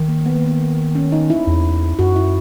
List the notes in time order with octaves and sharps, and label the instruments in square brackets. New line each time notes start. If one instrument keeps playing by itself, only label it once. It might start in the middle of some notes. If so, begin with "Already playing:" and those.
Already playing: [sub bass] D#3
[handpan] A#3
B3
A#3
B3
C#4
D#4
E4
[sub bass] E2
[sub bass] F#2 [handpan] F#4
[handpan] E4